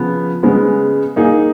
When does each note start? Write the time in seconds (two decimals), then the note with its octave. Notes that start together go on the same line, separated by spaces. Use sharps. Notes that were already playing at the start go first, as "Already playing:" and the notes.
Already playing: C#3 F3 B3
0.43 C#3 G#3 B3
1.16 A#3 D#4 G#4